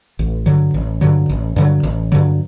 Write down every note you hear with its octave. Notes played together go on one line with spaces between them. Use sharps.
A1
G2 D3 F#3
A1
G2 D3 F#3
A1
G2 D3 F#3
A1
G2 D3 F#3